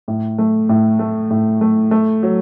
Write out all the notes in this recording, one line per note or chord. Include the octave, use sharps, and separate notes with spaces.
A2
A3
A2
A3
A2
A3
A3
F#3